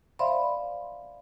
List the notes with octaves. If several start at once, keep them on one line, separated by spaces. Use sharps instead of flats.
C5 D5 E5 F5 B5 C6